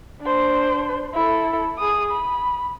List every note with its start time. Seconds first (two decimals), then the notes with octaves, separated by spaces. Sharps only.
0.22 D4 C5
1.14 E4 A4
1.78 G#4 D#6
2.11 B5